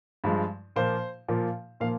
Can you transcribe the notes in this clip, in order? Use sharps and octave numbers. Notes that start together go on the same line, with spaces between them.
G2 F3 G#3
A#2 F3 A#3 C5
A#2 F3 A#3
A#2 F3 A#3 F5